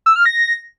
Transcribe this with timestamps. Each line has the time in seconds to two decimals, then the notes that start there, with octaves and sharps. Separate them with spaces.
0.06 E6
0.16 F6
0.26 A#6